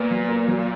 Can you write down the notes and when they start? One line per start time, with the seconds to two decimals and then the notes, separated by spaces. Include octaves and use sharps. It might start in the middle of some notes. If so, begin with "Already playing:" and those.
Already playing: A#2 B3
0.11 F#3
0.29 A#3
0.48 F#3